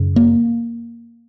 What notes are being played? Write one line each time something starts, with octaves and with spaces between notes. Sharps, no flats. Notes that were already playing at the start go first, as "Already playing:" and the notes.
Already playing: F#2 C#3
A#3